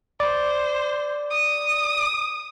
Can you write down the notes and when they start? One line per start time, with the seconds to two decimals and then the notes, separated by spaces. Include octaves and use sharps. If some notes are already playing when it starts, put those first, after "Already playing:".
0.20 C5 D5
1.30 D#6